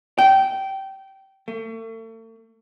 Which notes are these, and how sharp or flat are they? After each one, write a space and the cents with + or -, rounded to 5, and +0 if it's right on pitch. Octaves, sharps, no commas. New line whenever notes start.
G5 -20
A3 +40